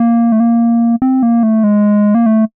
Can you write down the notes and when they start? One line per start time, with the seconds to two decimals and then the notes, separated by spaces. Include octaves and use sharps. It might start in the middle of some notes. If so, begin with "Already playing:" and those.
Already playing: A#3
0.32 A3
0.40 A#3
1.02 C4
1.23 A#3
1.43 A3
1.64 G#3
2.15 A#3
2.26 A3